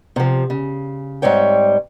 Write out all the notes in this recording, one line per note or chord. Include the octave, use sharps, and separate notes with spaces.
C3 F3
C#3
G#2 G3 C4 C#5 G5